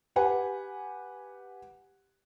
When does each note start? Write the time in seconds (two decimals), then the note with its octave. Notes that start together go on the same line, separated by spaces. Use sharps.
0.16 G4 B4 F#5 G#5